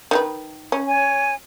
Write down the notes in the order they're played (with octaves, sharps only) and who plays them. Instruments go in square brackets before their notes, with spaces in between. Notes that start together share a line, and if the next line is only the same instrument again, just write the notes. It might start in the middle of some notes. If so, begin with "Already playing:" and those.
[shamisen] D#3 G4 B4
C#4
[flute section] C#5 G#5